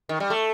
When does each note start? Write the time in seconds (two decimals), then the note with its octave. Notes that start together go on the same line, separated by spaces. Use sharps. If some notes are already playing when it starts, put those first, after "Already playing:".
0.09 D#3
0.20 G3
0.30 A3